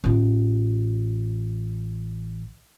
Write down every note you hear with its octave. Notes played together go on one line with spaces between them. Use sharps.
A1 F4